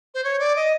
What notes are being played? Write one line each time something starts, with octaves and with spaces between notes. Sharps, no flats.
C5
C#5
D5
D#5